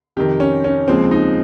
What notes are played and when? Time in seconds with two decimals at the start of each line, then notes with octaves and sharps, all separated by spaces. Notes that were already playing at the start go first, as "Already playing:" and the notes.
0.16 F2 C3 D#3 G4
0.40 C#4
0.64 C#4
0.88 D#2 C#3 F3 G#3 C4
1.11 D#4